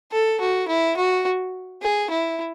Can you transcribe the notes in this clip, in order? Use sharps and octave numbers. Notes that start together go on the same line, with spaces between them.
A4
F#4
E4
F#4
G#4
E4